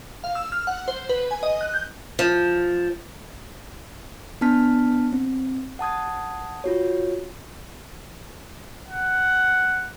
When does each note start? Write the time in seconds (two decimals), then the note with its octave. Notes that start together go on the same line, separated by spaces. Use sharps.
0.24 F5
0.35 E6
0.52 F6
0.67 F#5
0.88 C5
1.09 B4
1.31 G#5
1.43 D#5
1.61 F#6
1.74 G6
2.19 F3
4.41 B3 D4 A5 F6 B6
5.13 C4
5.79 F#5 A5 D#6 G#6
6.64 F4 F#4 C#5
8.89 F#5